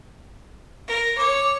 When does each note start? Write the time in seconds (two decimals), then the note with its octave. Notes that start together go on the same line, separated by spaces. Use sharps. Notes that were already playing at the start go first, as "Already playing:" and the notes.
0.88 A#4
1.18 C#5 D6